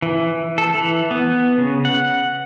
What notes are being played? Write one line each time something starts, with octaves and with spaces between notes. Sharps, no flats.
E3
A4
E3
B3
C#3
F#5